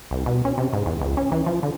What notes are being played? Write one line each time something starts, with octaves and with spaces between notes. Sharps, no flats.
C2
B2
C#4
C3
G#2
E2
C#2
C#4
E3
F3
D3